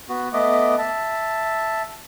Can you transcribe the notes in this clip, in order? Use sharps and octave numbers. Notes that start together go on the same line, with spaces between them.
B3 F#4
A3 B3 D#5 D6
E5 A5